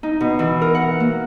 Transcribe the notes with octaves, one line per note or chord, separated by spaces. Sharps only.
D#4
B2
E3
A#4
F#5
A#3